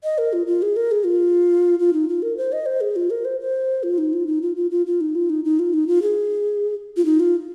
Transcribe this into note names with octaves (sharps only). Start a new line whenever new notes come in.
D#5
A#4
F4
F4
G#4
A#4
G#4
F4
F4
D#4
F4
A#4
C5
D#5
C5
G#4
F4
A#4
C5
C5
F4
D#4
F4
D#4
F4
F4
F4
F4
D#4
F4
D#4
D#4
F4
D#4
F4
G#4
F4
D#4
F4